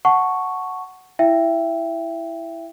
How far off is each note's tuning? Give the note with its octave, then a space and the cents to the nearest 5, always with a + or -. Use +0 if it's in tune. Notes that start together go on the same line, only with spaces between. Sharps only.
F#5 +0 A5 +0 C#6 +0
E4 +0 E5 +20 G5 +5